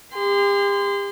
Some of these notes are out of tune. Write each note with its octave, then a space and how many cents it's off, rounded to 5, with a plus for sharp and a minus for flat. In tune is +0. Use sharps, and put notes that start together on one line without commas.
G4 +40 C6 -25